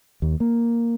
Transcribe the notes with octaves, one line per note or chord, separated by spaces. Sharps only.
D#2
A#3